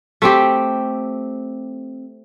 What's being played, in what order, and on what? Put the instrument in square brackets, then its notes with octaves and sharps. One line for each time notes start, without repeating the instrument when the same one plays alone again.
[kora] A3 C4 G4